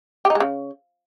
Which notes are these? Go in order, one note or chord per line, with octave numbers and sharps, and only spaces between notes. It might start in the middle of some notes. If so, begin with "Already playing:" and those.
G4
D#4
G#3
C#3